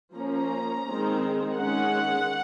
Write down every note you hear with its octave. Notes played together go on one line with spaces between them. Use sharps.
F3 A#3 C#4 A#5
D#3 G#3 C4
D#3 G#3 C#4 F#5